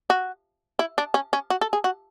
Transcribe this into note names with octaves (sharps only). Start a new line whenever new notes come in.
F#4
E4
D4
C#4
C#4
F#4
A4
G#4
F#4